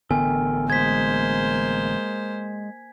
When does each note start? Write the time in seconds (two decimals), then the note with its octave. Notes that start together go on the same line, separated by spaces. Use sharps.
0.11 A1 D3 B3 A4 A#4 G5 G#5
0.70 G#3 A#3 C5 G#6 B6